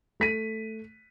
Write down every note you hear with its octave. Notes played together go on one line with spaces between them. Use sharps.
A3 B6 D#7